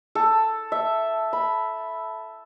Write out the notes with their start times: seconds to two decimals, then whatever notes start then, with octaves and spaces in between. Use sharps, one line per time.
0.15 A4
0.72 E5
1.33 B5